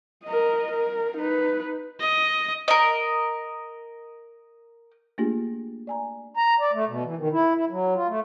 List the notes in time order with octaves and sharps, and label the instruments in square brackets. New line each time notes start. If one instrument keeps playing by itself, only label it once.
[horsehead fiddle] A#4 D#5
A#4
D#4 B4
[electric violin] D#5
[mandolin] A#4 D#5
[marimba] A3 A#3 D4 F4 G4 G#4
D5 G#5 A#5
[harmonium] A#5
D5
A3
B2
E3
D#3
E4
E4
F#3
F4
A3